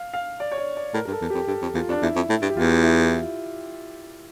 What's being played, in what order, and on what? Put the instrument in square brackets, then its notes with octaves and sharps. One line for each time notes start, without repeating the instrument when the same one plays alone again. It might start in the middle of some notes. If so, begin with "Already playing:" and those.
Already playing: [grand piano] F5
F5
D5
C#5
D5
D5
[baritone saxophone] A2 [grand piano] A#4
[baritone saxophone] G2 [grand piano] A#4
[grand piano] A4
[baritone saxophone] E2
[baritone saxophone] F2 [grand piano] G4
[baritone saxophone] G2 [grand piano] A4
[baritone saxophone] F2
[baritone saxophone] E2 [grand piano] F4
[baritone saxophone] F2 [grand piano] D4
[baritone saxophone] E2 [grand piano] E4
[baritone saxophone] F2
A2
G2
[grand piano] G4
[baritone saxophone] E2 [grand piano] F4
[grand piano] E4